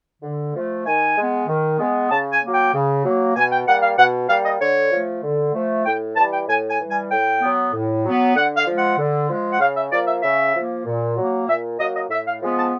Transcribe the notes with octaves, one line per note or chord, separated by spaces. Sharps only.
D3
F3 A3
D#3 G#5
G#3 B3
D#3
G#3 B3
C#3 A5
G#5
F#3 A#3
G5
C#3
F#3 A#3
B2 G#5
G5
G3 A#3 F#5
F5
B2 F#5
G3 A#3 F5
D#5
D3 C#5
F3 A3
D3
F3 A3
A2 G5
E3 G3 A5
G5
A2 G#5
G#5
E3 G3
G#5
A2 G5
F#3 B3
A2
F#3 B3
D3 F#5
F5
F3 G#3
F#5
D3
F3 G#3
F#5
C#3 F5
E5
F3 A#3 D5
E5
C#3 E5
F3 A#3
A#2
F#3 A#3
A#2 E5
F#3 A#3 D#5
D#5
A2 E5
F5
F3 G#3 B3
A5